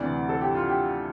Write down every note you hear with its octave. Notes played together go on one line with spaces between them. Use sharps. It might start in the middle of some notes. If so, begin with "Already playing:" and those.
Already playing: D2 C3 E3 D5
A4
G4
F4
G4